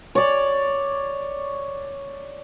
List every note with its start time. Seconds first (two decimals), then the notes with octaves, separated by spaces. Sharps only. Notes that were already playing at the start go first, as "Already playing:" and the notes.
0.15 C#5 D5